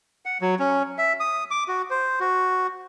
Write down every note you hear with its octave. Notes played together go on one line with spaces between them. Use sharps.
F#5
F#3
C#4
E5
D#6
D6
F#4
C5
F#4